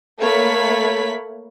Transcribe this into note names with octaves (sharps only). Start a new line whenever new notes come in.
A3 A#3 C#5 B5 B6